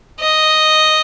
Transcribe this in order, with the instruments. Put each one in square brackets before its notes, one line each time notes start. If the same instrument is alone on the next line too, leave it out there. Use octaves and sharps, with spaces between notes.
[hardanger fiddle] D#5